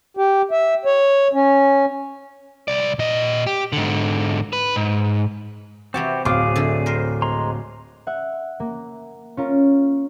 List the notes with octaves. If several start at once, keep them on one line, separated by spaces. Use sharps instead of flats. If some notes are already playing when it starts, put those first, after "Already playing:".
G4
E5
C#5
C#4
C2 D5
A#2 D#5
G4
G#2 D3
B4
G#2
C3 E3 C4 F#4 G4 A5
D1 F4 G#4 D6
D3 A3
A#4 C5
G#3 A#5 C6
E5 F#5
A#3
C#4 F4 A#4